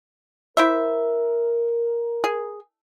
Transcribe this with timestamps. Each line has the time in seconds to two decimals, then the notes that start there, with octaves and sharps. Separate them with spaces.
0.57 E4 A#4 C5 E5
2.24 G#4